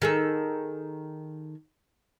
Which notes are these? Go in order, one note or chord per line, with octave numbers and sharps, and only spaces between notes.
D#3 G#4 A4